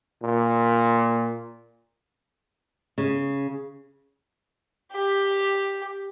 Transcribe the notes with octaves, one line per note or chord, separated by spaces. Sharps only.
A#2
C#3
G4